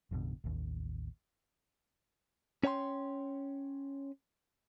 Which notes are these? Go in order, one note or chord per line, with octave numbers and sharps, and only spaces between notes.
A1 F2 B2 D3
A1 D#2
C#4 C#5 G5 A5 C6